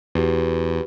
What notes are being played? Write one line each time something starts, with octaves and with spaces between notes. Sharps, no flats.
E2 F#4 G4 B4